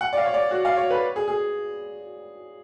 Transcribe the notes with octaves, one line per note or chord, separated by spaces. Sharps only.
F#5
D5
F5
C#5
D5
F#4
F5
C#5
B4
G#4
G#4